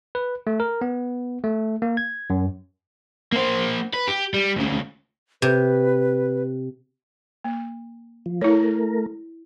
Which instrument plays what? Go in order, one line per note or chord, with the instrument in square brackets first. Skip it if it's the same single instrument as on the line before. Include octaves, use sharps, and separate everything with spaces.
[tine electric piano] B4
A3
A#4
B3
A3
A#3
G#6
F#2
[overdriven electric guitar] A#3 C5
B4
G4
G3
D2 C#3
[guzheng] C3 [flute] B4
[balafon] A#3
[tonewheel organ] F3
[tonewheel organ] A3 A#4 [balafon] E4 C#5